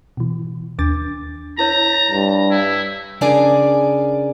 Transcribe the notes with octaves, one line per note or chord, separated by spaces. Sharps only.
B2 E3
D#2 D4 D6 A6
E4 A#4 C#5 A#5
G2
E4 E5
C#3 D4 G#4 A#4 D5 G#5